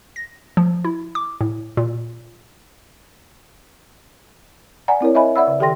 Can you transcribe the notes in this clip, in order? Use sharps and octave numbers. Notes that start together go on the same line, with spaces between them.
A#6
F3
E4
D6
A2
A#2
D5 F#5 G#5 A#5
C4 E4 A#4 C#5
C#5 D#5 E5 G#5 B5
D5 E5 F#5 B5 E6
C#3
D#3 G4 A4 G5 C6 A#6